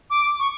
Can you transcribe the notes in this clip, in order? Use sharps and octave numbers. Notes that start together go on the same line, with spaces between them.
D6
C#6